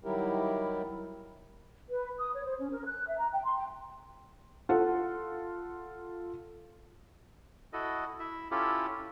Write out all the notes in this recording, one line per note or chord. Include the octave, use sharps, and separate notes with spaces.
D#3 F#3 G3 E4 G4 A#4
B4
D#6
C#5
C5
C#4
A#4
F#6
E5
A#5
G5
C6
G5
F4 A4 F#5
E4 F#4 A4 D#5
E4 E5
C#4 E4 F4 G4 A4